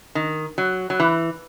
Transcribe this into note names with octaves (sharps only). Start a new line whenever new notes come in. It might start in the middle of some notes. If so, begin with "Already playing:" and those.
D#3
F#3
F#3
E3